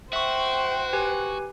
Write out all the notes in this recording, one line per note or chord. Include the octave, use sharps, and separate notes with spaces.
F#4 C5 E5 G5 C#6
G4 B4 G#5